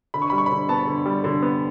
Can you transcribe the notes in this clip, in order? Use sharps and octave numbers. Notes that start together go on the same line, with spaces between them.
D3 B5
C#6
G3 B5
C#6
D3 B5
B3 A5
D3
G3
D3
B3